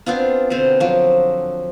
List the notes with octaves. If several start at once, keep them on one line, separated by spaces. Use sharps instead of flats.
B3 C4 D4 F4
B2 D3 C4
F3 F#3